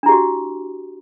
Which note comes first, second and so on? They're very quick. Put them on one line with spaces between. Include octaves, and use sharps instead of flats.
D4 E4 G4 F#4